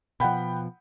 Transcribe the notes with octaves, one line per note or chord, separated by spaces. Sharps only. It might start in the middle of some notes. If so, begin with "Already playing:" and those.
B2 F3 F#5 G5 B5